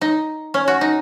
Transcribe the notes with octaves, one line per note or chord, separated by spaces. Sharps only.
D#4
C#4
F#4
D#4